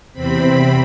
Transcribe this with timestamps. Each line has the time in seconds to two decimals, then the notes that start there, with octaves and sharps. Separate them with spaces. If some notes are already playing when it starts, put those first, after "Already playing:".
0.13 E2 C3 C4 B5